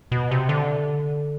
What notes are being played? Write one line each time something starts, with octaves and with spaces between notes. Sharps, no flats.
B2
C3
D3